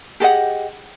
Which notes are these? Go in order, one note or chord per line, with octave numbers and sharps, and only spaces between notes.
G4 G#4 D#5 F#5